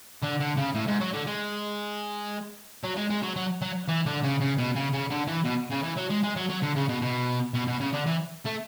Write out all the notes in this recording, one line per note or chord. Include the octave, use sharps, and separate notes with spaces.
D3
D3
C#3
A2
G#2
F#3
D3
G#3
F#3
G#3
G#3
F#3
F#3
F#3
E3
D3
C#3
C#3
B2
C#3
C#3
D3
E3
B2
C#3
E3
F#3
G#3
G#3
F#3
F#3
D3
C#3
B2
B2
B2
B2
C#3
D3
E3
A3